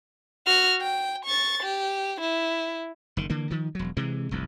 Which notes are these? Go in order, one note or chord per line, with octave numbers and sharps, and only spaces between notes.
F#4 F6
G5
C#6 A6
G4
E4
F#1 D#3
D3 E3 A#3
D#3 F3
E1 F#3
C3 E3 G#3
F1 C2 G2